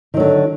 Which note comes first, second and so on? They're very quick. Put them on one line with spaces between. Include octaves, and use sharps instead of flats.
D#3 F#3 D3